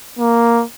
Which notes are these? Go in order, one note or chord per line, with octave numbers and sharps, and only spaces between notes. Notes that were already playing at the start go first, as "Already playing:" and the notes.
A#3